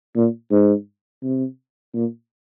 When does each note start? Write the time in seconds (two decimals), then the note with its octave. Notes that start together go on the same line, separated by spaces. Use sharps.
0.16 A#2
0.52 G#2
1.23 C3
1.95 A#2